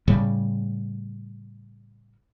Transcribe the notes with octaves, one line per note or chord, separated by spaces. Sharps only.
A2 C#3 G3